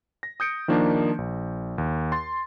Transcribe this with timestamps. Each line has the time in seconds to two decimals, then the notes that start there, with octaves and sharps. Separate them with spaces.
0.23 A#6
0.40 D#6 G6 C#7 D7
0.68 D#3 F3 A#3 D4 D#4
1.18 A#1
1.78 D#2
2.12 C6 A6